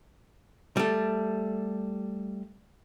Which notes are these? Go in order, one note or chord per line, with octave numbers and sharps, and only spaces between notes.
G3 A3